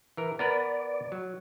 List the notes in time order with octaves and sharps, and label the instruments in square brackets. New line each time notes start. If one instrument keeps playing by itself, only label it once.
[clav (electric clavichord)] E3 A#4
[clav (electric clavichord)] B3 A#4 B4 [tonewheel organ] D5
[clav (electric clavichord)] F#3